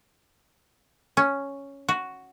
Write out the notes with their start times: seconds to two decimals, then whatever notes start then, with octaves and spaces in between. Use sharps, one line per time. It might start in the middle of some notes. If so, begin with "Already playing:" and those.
1.17 C#4
1.89 F#4